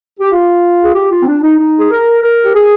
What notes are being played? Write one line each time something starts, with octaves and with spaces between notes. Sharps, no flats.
G4
F4
G#4
G4
F4
C4
D4
D#4
D#4
G#4
A#4
A#4
G4
G#4